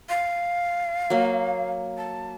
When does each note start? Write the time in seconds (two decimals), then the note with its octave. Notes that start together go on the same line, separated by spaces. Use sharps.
0.09 F5
1.10 F#3 A#3
1.97 A5